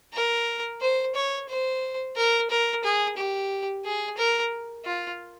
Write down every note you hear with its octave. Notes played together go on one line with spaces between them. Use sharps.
A#4
C5
C#5
C5
A#4
A#4
G#4
G4
G#4
A#4
F4